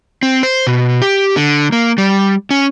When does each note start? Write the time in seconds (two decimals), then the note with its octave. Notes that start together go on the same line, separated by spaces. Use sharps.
0.23 C4
0.43 C5
0.67 B2
1.02 G4
1.36 D3
1.72 A#3
1.98 G3
2.51 C#4